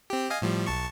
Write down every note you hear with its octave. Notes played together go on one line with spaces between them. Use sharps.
C4 G4
D#5 F5 G#5
A2 F3 G3
B1 A5 C#6